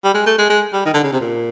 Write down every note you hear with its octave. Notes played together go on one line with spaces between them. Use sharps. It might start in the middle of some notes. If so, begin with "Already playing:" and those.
G3
G#3
A3
G#3
G#3
G3
D#3
D3
C#3
C3
A#2